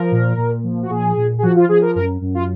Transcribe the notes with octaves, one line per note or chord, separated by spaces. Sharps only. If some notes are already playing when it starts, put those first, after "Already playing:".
Already playing: F3 A#4
A#2
A#2
F3
F#4
A#2 G#4
A#2
G#4
F3 F#4
F4
F3 G#4
A#4
F#2 A#4
F#2
F4